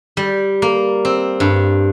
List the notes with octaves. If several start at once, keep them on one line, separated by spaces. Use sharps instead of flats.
G3
A#3
C4
G2